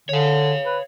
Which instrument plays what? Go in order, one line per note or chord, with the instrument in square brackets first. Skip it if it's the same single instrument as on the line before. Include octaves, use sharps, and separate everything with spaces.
[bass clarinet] D3 [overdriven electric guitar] C#5 F5
[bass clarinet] B4